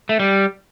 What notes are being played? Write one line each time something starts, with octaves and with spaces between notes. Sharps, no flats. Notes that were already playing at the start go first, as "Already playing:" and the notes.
A3
G3